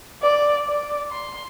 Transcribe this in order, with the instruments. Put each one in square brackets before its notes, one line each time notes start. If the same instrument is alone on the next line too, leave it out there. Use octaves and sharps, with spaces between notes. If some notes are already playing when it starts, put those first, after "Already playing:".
[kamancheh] D5
D5
C6